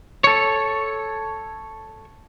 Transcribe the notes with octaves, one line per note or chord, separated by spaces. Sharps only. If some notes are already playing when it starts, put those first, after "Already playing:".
A4 C#5